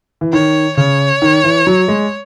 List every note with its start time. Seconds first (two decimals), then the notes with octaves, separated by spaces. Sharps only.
0.21 E3
0.33 D#3 C#5
0.77 C#3 C#5
1.22 D#3
1.44 E3
1.67 F#3
1.88 G#3